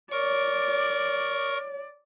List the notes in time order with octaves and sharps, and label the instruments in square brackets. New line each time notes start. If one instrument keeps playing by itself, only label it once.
[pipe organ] A#4 C#6 [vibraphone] C#5 [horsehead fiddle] D5